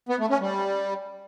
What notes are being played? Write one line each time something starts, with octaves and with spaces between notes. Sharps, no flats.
B3
A3
C#4
G3